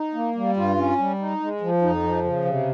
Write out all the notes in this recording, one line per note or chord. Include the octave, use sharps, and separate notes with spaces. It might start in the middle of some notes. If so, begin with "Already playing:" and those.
Already playing: D#4
A#3
G3
G2 F4
C#4
G3
D#4
G#3
F3
F2 D#4
F3
C#3
C3